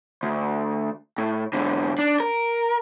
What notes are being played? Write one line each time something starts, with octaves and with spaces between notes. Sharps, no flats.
D2
A2
G#2 D3
D4
A#4